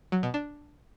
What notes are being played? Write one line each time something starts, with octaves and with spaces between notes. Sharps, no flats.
F#3
B2
D4